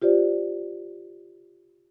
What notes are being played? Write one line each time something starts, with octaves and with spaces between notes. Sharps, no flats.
F4 G4 C5 D5